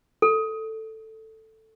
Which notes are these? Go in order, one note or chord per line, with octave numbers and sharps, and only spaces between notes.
A4